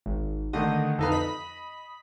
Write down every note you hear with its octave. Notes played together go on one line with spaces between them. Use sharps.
G#1
D3 D#3 A3 D#5
F2 D#4 A4 B4 F5
D#5 B5